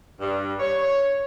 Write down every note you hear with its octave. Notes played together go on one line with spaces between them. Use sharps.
G2
C#5